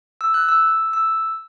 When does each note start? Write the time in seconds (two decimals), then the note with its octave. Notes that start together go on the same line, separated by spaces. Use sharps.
0.21 E6
0.34 F#6
0.49 E6
0.93 E6